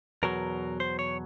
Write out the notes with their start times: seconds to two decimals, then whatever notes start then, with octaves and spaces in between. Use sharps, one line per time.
0.23 E2 B2 F#3 A#4
0.80 C5
0.99 C#5